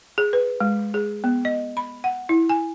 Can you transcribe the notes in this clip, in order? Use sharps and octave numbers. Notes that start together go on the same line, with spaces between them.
G#4
B4
G#3
G#4
B3
D#5
B5
F#5
E4
G#5